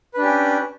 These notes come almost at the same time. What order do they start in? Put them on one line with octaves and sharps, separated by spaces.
B4 D4 G4 C#4